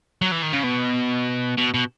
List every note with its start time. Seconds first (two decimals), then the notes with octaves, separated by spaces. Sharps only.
0.22 F#3
0.32 E3
0.43 D#3
0.53 C#3
0.64 B2
1.58 B2
1.74 B2